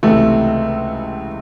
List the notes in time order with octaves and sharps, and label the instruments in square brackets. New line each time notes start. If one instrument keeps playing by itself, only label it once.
[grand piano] C#2 C3 E3 [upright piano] A3